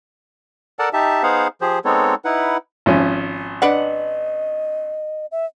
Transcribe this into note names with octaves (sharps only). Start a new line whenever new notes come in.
A4 A#4 D5 F#5 A5
D#4 G4 E5 A5
B3 D#4 G#4 C5 F5 F#5
F3 G4 G#4 C5
G#3 B3 C4 D#4 A4 C#5
D#4 E4 B4 F#5
G#1 F3 C#4
D4 B4 D#5 F#5
E5